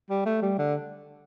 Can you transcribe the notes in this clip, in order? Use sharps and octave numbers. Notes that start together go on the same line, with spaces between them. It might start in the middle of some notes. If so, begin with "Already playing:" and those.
G3
A3
G3
D3